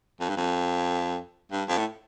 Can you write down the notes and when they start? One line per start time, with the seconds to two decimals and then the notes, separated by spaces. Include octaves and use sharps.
0.20 F2
0.29 G2
0.37 F2
1.52 G2
1.68 F2
1.78 A2